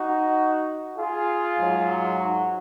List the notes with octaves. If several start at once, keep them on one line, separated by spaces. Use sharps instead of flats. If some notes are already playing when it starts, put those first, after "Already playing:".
Already playing: D#4 F#4
F4 G#4
G#2 F#3
D#4 F#4